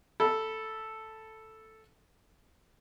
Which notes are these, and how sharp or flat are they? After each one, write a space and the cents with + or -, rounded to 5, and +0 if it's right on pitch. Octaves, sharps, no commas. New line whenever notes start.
A4 +0 B5 -15